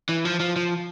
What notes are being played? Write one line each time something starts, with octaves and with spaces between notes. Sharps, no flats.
E3
F3
F3
F3